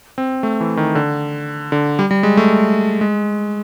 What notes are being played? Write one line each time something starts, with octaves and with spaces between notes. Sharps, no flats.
C4
A3
E3
D#3
D3
D3
G3
G3
G#3
A3
G#3